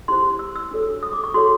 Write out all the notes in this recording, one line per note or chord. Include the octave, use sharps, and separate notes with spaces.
E4 G4 C5 C6
E6
E6
D4 F#4 A4 C#5
D#6
D6
C#6
F#4 A4 C#5 C6